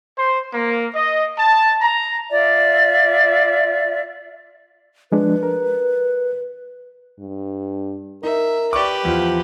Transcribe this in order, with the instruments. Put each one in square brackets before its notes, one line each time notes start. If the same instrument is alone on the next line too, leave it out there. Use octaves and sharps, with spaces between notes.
[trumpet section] C5
A#3
D#5
A5
A#5
[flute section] F4 D5 E5
[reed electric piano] F3 G#3 D4 [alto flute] B4
[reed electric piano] A#4
[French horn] G2
[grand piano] D#4 [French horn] A#4 [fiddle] E5
[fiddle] G4 B4 [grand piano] D5 C#6 D6
[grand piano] E2 F4 [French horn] F3